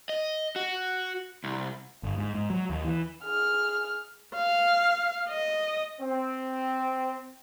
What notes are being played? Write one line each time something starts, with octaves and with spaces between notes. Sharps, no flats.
D#5
F#4
C2
G1
G#2
G#2
F#3
D#2
E3
G#4 F6
F5
D#5
C4